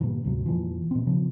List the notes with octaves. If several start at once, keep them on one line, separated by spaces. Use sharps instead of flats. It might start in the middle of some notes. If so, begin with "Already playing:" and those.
G2 A#2 D3 E3
D2 G#2 C3 F#3
F2 A#2 E3 F3
A#2 C4
C#3 F3